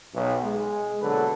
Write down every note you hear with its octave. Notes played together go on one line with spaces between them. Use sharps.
B1
G#3
A#1 B2 D3 F#3 A4 B4